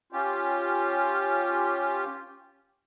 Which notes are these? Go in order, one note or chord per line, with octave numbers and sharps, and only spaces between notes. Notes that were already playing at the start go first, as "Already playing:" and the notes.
C#4 F4 G4